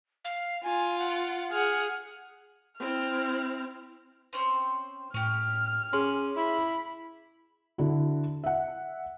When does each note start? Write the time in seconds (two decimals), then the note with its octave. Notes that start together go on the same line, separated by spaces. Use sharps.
0.25 F5
0.63 F4 G#5
0.99 F#5
1.51 G#4 F#5 F6
2.80 C4 E4 F6
4.33 C4 C#4 C5
5.14 A2 C#4 G4 F6
5.93 C#4 G#4 D5 C6
6.36 E4 B5
7.78 D3 E4 F#4
8.44 E5 F#5